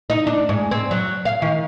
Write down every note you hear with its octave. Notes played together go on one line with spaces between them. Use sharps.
D#4
D4
G#2
C4
F#3
F5
D#3